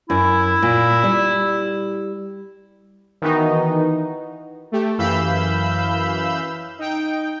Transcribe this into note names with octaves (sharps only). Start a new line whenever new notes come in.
F#2 E4
A#2
G3
D#3 E3 B3 D#4 F#4
A3 G4
F#2 E3 F5 B5 E6 G6
D#4 G5